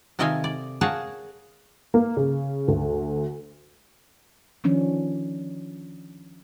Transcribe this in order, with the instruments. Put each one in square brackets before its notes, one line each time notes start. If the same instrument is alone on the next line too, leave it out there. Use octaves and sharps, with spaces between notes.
[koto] C3 D#3 A4 D#5 F5 G#5
D5
G#4 A#4 C#5 F5 F#5 A5
[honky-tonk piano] A#3
C#3
D2
[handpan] D#3 F3 C#4 D4